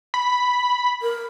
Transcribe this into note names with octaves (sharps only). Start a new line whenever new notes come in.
B5
A#4